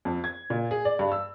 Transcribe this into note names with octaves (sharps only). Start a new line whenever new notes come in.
F2
G#6
A#2
G#4
D5
G2
E6